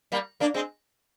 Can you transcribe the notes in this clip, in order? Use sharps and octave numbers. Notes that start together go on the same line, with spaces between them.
G3 A#3
A#3 D4
G#3 C4